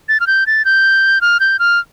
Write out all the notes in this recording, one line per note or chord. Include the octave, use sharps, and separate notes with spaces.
A6
F6
G6
A6
G6
F6
G6
F6